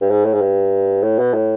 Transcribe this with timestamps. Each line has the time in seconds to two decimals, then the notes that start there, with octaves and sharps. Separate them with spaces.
0.02 G2
0.11 G#2
0.24 A2
0.34 G#2
0.41 G2
1.03 A2
1.19 B2
1.34 A2